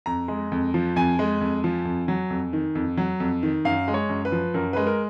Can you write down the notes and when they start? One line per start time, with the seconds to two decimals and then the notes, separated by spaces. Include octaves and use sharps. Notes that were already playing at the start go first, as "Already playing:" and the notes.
0.06 F2 A#5
0.28 G#3
0.52 F2
0.74 F3
0.96 F2 G#5
1.19 G#3
1.41 F2
1.64 F3
1.85 F2
2.08 F#3
2.30 F2
2.53 D#3
2.75 F2
2.97 F#3
3.20 F2
3.43 D#3
3.65 F#2 F5
3.88 G#3
3.94 C#5
4.09 F#2
4.25 B4
4.32 F3
4.54 F#2 A#4
4.73 G#3 B4
4.87 A#4